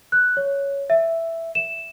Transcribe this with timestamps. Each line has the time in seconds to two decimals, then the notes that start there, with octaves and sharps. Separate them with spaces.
0.12 F#6
0.37 C#5
0.90 E5
1.55 E7